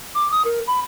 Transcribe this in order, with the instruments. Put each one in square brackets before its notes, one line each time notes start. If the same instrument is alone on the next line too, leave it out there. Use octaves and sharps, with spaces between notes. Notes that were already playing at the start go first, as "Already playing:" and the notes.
[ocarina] D6
D#6
A#4
B5